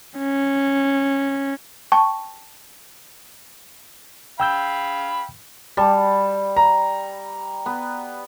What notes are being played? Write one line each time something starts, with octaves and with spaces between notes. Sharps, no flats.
C#4
G5 A5 C#6
F5 G5 B5 E6 G6
G3 A5
A#5
B3